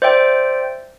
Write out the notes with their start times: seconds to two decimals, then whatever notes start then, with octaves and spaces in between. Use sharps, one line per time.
0.02 C5 D5 E5 G5